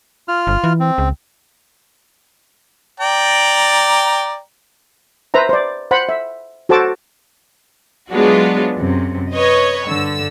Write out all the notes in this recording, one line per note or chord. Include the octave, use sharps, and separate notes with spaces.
F4 F6
G1
E3
C4
C#2
D5 G5 A#5
B4 C5 E5 A#5
C5 D5
C5 F#5 B5
E5
F#4 A4 C5 A5 D6
F#3 G#3 B3 D4 F4 F#4
F#2 C3
B4 C#5 D#5
G2 D3 E6